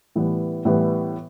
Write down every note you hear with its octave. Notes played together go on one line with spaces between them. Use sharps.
A2 E3 G3 B3
A2 E3 G3 B3